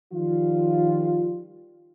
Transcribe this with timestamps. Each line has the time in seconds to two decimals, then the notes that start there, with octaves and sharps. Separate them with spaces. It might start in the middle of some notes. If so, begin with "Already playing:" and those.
0.13 D#3 F3 G3 F4